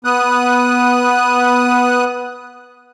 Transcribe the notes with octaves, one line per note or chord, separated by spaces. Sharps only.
B3 D#6 F#6